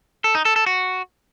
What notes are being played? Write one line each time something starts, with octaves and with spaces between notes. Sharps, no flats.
A4
D#4
A4
A4
F#4